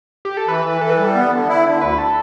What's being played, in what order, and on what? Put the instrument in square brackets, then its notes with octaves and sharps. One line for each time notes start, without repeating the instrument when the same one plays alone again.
[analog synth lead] G4
A4
[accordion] E3 [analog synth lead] B4
[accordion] E3
[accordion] E3 [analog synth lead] A4
[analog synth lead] B4
[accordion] G3 [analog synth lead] A4
[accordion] B3
D3
E4
D3
[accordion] D2 [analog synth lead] B4
[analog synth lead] A4